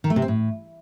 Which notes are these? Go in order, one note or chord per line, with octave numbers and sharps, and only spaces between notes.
D#3
A3
C3
C4
A2